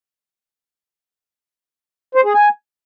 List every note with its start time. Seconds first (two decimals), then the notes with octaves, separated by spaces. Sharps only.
2.15 C5
2.25 G#4
2.34 G#5